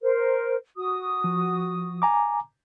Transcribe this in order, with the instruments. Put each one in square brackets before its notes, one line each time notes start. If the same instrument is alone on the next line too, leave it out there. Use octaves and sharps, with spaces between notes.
[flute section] A#4 C5
F#4 D#6
[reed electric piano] F3
G#5 A#5 D6